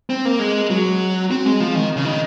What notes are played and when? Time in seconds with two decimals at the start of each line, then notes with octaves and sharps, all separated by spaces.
0.10 C4
0.25 A#3
0.39 G#3
0.70 F#3
1.31 C4
1.46 G#3
1.60 F3
1.75 D#3
1.96 C#3
2.05 D#3